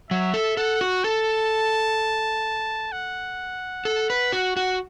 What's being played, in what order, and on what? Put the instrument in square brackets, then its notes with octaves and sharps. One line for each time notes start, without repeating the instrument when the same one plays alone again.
[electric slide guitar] F#3 [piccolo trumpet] E5
[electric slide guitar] A4
[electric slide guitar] A4 [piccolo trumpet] F#5
[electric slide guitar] F#4
[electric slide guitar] A4 [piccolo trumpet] A5
[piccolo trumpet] F#5
[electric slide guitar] A4
B4
F#4
F#4